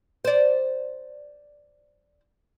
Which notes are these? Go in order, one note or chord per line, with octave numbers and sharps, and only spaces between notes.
C5 D5